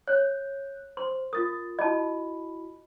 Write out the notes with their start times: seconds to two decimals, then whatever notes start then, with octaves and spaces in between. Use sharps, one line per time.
0.07 C#5 F#6 G6
0.97 C5 C6
1.33 F4 A#4 D#6 A6
1.79 E4 F#4 D#5 A5 B5